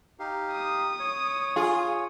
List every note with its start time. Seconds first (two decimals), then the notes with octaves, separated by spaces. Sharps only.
0.19 D#4 G4 F5
0.52 D#6
0.99 C#5
1.56 F4 G#4